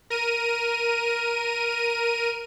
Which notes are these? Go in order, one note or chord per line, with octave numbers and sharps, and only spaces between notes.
A#4 D#7